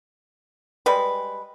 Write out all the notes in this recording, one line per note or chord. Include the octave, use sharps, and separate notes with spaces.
G3 G#3 B4